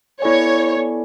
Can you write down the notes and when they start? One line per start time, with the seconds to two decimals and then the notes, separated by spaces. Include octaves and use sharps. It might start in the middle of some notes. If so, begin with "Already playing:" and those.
0.22 B3 E4 A4 C#5 D5 G#5
0.77 B3 E4 A4 D5 G#5